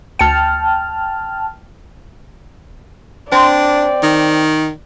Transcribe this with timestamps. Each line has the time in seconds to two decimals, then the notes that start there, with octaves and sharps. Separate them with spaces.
0.19 D2 G5 A5 F6 C#7
3.32 C4 D4 D5
4.03 D#3